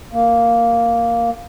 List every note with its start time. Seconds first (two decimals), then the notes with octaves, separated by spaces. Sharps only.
0.13 A#3